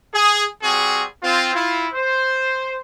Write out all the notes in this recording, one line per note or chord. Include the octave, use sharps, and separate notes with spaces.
G#4
G3 C4 F#4 G#4
C4 F4
E4 F4
C5